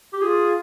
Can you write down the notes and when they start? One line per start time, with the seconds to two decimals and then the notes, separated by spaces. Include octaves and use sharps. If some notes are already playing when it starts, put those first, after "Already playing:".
0.13 G4
0.21 F4 G#4